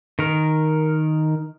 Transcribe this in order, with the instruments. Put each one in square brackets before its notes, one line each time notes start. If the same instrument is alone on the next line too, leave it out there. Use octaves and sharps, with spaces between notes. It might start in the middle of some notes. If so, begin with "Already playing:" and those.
[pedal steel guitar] D#3 A#4